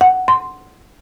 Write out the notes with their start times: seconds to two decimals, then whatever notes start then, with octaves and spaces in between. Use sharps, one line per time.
0.01 F#5
0.28 C6